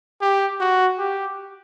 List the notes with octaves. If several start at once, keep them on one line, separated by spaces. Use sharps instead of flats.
G4
F#4
G4